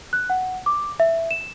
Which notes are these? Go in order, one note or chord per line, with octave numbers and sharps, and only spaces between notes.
F#6
F#5
D6
E5
E7